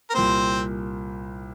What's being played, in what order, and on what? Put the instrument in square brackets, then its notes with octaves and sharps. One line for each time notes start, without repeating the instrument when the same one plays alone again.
[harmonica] A#4
[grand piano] C2 A#2 A#3 [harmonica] C4 C5